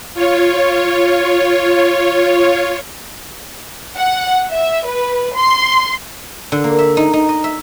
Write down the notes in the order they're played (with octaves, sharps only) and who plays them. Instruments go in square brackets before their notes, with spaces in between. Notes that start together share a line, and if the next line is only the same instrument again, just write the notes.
[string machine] F4 C#5
[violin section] F#5
E5
B4
C6
[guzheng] D3
A#3
E5
D#4
D#4
D#5
E5